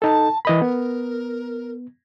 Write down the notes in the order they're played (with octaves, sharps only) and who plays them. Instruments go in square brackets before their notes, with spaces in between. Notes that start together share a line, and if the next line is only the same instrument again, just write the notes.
[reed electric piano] D#4 A4 [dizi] A5
[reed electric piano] E3 D#5 B5 [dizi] A#4
[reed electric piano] B3 [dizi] A#4